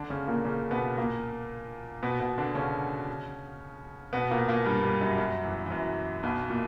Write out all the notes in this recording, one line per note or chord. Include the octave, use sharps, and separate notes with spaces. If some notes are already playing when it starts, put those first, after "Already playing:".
Already playing: D3 D4
C#3 C#4
A#2 A#3
C#3 C#4
B2 B3
A#2 A#3
B2 B3
B2 B3
D3 D4
C#3 C#4
B2 B3
A#2 A#3
A#2 A#3
G2 G3
G2 G3
F#2 F#3
F#2 F#3
E2 E3
E3
F#2 F#3
B1 B2
A#2